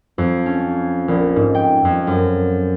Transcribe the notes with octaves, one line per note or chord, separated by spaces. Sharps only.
F2
C#4
A#1
G#2
G5
F2
F#2